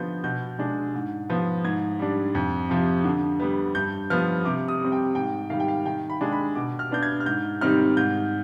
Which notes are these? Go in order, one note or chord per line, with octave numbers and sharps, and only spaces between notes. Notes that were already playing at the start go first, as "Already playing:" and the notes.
Already playing: D3 F3 B3 G6
B2 G6
G#3 D4
G#2
F3 B3
G#2 G#6
G3 D4
F2
C3 F3
D3
G3 B3
G2 G6
F3 B3 F6
C3 D6
D#6
G3 C4
G5
G#2 G5
D#3 G3 F5
G5
F5
D#3 G5
B5
G#3 D4
B5
B2 D6
F6
B3 D4 G6
G#6
F6
G#2 G6
D#3 G3 C4 D#4 F6
G#2 G6